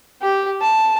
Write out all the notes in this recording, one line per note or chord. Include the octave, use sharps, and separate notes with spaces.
G4
A5